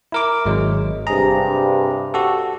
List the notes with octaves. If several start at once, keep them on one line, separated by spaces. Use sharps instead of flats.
E4 A#4 D6
G#1 F#3 G#3
G2 C3 G#4 A#5
F#4 G4 A4